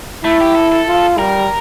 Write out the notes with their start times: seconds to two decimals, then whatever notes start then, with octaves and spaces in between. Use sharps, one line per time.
0.24 A3 E4
0.41 G4
0.55 A4
0.72 A4
0.88 F4
1.19 G3 A#4